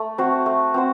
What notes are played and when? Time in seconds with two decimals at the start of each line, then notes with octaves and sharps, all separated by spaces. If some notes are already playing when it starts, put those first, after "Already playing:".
Already playing: A3
0.18 C4 F#4 C5
0.46 A3
0.74 C4 F#4 C5